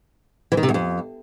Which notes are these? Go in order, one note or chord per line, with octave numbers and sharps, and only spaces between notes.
E3
D#3
C3
E2
F2